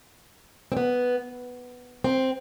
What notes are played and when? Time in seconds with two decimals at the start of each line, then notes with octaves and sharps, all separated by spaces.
0.72 C4
0.77 B3
2.04 C4